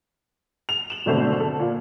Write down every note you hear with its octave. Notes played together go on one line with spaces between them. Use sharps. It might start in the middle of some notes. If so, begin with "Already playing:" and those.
F7
E7 F#7
G#1 B2 D3 A3 C4 C5
A4
A#2 A#3